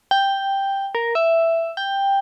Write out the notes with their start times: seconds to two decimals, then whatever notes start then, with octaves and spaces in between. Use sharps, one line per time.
0.11 G5
0.95 A#4
1.15 E5
1.77 G5